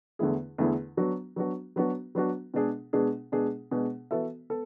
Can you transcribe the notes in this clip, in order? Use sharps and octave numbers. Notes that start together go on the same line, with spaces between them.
E2 D3 A3 E4 G#4
E2 D3 A3 E4 G#4
F#3 B3 D4 F#4
F#3 B3 D4 F#4
F#3 B3 D4 F#4
F#3 B3 D4 F#4
B2 G#3 D4 G#4
B2 G#3 D4 G#4
B2 G#3 D4 G#4
B2 G#3 D4 G#4
E3 B3 F#4 A4 E5
B3 A4